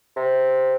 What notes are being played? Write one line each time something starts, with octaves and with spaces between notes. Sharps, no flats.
C3